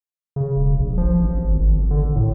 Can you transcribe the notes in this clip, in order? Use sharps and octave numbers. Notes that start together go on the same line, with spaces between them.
C#3
E1
A#1
F3
A1
G#1
G#1
G1
D3
G#1
A2